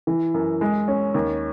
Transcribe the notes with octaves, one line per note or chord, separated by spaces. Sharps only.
E3
F#2
G#3
C#4
D#2